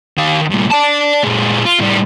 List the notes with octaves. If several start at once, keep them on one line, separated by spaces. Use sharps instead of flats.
D#3 F5
G2 A#2
D5 A5
A#2 G#3
F4
A2 G3